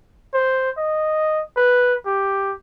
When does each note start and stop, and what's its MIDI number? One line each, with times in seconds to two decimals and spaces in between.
0.34 0.70 72
0.77 1.42 75
1.56 1.95 71
2.06 2.53 67